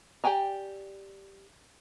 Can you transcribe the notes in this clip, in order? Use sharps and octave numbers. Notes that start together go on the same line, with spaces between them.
G4 D5 G5 G#5 A#5